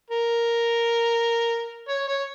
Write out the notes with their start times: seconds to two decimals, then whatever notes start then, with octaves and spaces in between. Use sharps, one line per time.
0.10 A#4
1.89 C#5
2.08 C#5